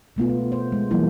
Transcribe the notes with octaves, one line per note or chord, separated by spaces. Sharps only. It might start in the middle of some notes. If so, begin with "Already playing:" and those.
B2 A3 B3 F4
A3
C5
G#3
E3 F#3 G3 A#3 E4